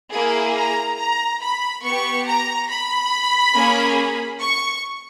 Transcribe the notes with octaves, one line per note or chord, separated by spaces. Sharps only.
A#3 E4 G#4
A#5
A#5
B5
B3 G4 C#6
A#5
B5
A#3 C#4 G#4
C#6